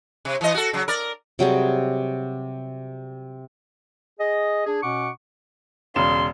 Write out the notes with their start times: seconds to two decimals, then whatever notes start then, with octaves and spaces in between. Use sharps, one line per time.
0.25 C3
0.41 E3 D#5
0.54 F#4 A4
0.73 C#3 F#3
0.88 A#4 D5
1.39 C3 F#3 G3 G#4
4.19 G#4 D#5
4.66 D4 G#4
4.83 B2 C#4 F#5 C#6 D6
5.96 E1 C#3 C6 E7